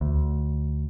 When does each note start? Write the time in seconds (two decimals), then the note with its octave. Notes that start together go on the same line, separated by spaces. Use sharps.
0.01 D2